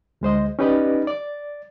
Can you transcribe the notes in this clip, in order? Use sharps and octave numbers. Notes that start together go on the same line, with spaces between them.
D2 G#3 C5 D#5
C#4 D#4 G4 B4 D5 D#5
D5